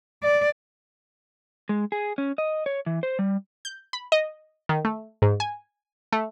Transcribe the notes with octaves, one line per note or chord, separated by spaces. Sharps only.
D5
G#3
G#4
C#4
D#5
C#5
E3
C5
G3
G6
B5
D#5
D#3
A3
G#2
G#5
A3